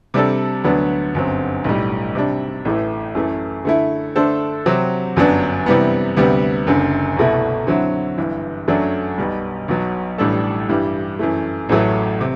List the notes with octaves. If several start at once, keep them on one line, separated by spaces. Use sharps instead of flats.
C3 G3 D4 A4
D2 D3 F#3 B3 D4
G1 F#2 F#3 C4
B1 A2 G3
C3 G3 D4
A1 A2 E3 A3
F#2 E3 A3
D3 A3 E4
D3 A3 D4 A4 C5
C3 F#3 C4 G4
G1 F#2 F#3 B3 D4
C3 E3 G3 B3
D2 C3 G3 B3
F#1 F#2 D3
C2 B2 A3 E4
D3 F#3 C4 E4
G1 G2 E3
F#2 F#3 A3 D4 F#4
B1 B2 G3
B1 B2 F#3
A1 A2 G3 D4 A4
G2 E3 G3
F#2 E3 A3
A1 A2 F#3 A3
C3